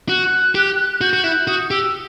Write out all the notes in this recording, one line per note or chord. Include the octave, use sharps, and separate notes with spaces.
F#4 F#6
G4
F#4 G6
F#4
E4 F#6
F#4 D#6
G4 E6